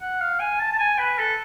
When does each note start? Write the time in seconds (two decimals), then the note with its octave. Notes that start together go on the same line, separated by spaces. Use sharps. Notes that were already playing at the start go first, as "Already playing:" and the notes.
0.01 F#5
0.21 F5
0.40 G#5
0.59 A5
0.73 A5
0.79 G#5
0.98 B4
1.19 A4